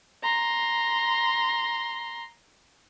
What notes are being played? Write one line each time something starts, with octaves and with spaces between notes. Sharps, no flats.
A#5 C6